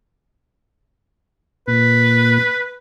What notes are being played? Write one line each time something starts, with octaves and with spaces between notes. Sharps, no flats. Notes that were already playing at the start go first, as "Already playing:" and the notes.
A#2 B4